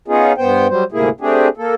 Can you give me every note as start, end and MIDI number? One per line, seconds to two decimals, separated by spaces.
0.08 0.33 59
0.08 0.33 61
0.08 0.33 63
0.08 0.33 65
0.08 0.33 68
0.37 0.67 43
0.37 0.67 59
0.37 0.67 72
0.37 0.67 79
0.69 0.84 54
0.69 0.84 55
0.69 0.84 72
0.92 1.09 38
0.92 1.09 44
0.92 1.09 48
0.92 1.09 58
0.92 1.09 64
0.92 1.09 68
1.21 1.48 57
1.21 1.48 60
1.21 1.48 62
1.21 1.48 67
1.21 1.48 68
1.57 1.75 58
1.57 1.75 69